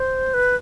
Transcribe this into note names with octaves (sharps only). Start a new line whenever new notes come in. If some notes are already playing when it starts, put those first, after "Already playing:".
Already playing: C5
B4